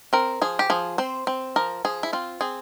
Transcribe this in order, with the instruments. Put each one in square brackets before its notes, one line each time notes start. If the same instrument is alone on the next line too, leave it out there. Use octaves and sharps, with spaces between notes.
[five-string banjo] C4 A#4
F3 G#4
G4
F3 G#4
C4 C5
C4
F3 A#4
F3 G#4
E4
C4 F4
C4 G#4